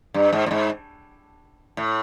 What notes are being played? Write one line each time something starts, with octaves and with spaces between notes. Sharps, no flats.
G2
G#2
A2
G#2
A2